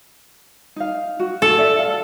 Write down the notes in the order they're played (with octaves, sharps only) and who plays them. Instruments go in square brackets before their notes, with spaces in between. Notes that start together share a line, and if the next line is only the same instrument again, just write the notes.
[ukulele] D#4 F5
F#4
[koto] A4
[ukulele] D5 E5
F5